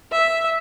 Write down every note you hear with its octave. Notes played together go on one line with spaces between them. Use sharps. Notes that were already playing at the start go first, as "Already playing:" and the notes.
E5